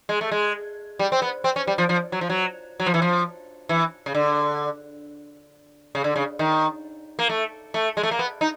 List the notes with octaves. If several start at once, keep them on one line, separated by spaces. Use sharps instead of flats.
G#3
A3
G#3
G3
C4
B3
C4
C#4
G3
F3
F3
F#3
F3
F#3
F#3
F3
E3
F3
E3
C#3
D3
C#3
D3
C#3
D#3
A#3
A3
A3
G#3
A3
A#3
B3
D#4